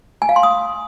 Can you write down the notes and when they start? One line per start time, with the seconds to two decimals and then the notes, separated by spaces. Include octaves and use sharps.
0.22 G#5
0.29 F5
0.36 C6
0.43 D#6